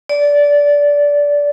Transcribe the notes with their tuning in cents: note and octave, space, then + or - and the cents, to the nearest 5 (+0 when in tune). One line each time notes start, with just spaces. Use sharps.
D5 -15